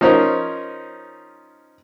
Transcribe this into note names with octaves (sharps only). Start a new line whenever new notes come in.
F3 C#4 D#4 A#4 C5 C#5